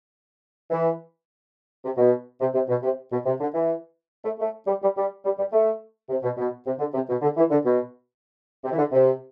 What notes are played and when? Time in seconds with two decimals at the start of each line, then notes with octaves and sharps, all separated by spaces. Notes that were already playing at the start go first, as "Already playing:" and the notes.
0.70 E3
1.84 C3
1.97 B2
2.41 C3
2.54 C3
2.68 B2
2.83 C3
3.12 B2
3.26 C3
3.40 D3
3.54 E3
4.24 A3
4.38 A3
4.66 G3
4.82 G3
4.96 G3
5.24 G3
5.37 G3
5.52 A3
6.09 C3
6.22 B2
6.37 B2
6.66 C3
6.79 D3
6.93 C3
7.08 B2
7.22 D3
7.37 E3
7.50 D3
7.64 B2
8.64 C3
8.72 E3
8.77 D3
8.92 C3